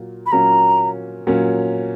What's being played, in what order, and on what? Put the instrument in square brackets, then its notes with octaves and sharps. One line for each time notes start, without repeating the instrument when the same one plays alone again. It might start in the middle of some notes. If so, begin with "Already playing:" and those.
Already playing: [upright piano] A#2 F#3 A#3
[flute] B5
[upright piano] A#2 F#3 A#3 C#4 [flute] A#5
[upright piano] A#2 F#3 A#3 C#4